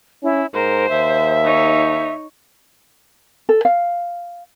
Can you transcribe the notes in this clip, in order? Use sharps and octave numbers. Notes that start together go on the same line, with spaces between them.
C#4 E4
G#2 A#4 C5
D#2 E5
D#4 C#5
A4
F5